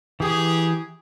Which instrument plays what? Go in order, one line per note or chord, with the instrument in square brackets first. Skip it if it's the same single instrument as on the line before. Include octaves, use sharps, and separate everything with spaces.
[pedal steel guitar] E3 D#6 [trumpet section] G4 G#4